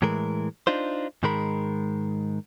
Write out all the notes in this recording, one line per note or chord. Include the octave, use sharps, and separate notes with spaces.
A2 E3 G#3 A#4
D4 D#4 F4 C5
G#2 D#3 G#3 A#4 B5